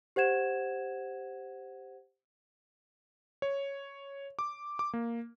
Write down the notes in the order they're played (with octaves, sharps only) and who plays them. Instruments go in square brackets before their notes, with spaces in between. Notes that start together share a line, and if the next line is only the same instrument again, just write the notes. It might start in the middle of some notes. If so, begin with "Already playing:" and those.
[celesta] G4 C5 F#5 G#6 E7
[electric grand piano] C#5
D6
D6
A#3